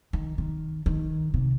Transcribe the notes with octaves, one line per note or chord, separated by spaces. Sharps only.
D#3
D#3
D#3
C3